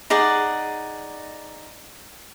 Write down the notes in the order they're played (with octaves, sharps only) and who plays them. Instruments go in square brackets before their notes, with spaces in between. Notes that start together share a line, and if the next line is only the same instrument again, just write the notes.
[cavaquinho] D#4 G#4 D5 F#5